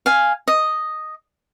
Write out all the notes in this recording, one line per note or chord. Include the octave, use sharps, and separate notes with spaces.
F5 G#5
D#5